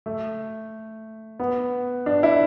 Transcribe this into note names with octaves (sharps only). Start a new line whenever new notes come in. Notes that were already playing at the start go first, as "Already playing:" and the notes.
A3
B3
D4
E4